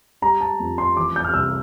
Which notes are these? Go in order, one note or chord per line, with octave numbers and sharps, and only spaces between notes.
G3 A#5
A5
F2
C6
E3 D6
G6
F6
C2 E6